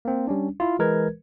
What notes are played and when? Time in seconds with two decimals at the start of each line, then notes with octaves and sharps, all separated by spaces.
0.05 A#3 C4
0.27 G3 C#4 D4
0.60 E4 F4
0.79 E3 G#3 A#4 B4 G#6